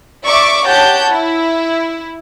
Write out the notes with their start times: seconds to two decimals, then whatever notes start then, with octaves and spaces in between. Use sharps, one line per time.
0.24 D5 E5 C#6 D6
0.66 G4 C#5 F#5 A5 G6
1.10 E4